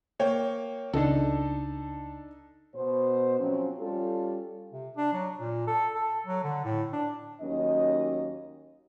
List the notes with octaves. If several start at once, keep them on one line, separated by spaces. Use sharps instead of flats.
A#3 C#5 G5
C#2 D4 D#4 A4
B2 C5
F3 F#3 C4 C#4
G3 C#4 F4 G4 A4
C3
D4
F#3
A#2
A4
A4
F#3
D3
A2
D4
D#2 F#3 C#4 D#5